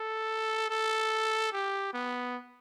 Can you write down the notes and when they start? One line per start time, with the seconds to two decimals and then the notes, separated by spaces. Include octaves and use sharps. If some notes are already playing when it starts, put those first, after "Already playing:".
Already playing: A4
0.70 A4
1.52 G4
1.93 B3